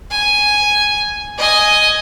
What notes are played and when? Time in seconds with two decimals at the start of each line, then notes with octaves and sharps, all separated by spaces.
0.11 G#5
1.38 D#5 G#5